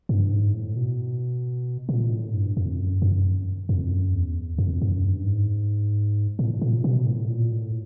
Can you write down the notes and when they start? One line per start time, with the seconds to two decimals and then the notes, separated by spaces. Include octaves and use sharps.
0.09 G2
0.31 G#2
0.54 A2
0.76 B2
1.89 A#2
2.12 A2
2.34 G2
2.57 F2
2.79 F#2
3.02 F#2
3.69 F2
3.91 F#2
4.14 E2
4.58 F2
4.82 F#2
5.04 G2
5.26 G#2
6.39 A2
6.62 A#2
6.84 B2
7.06 A2
7.29 A#2
7.51 A2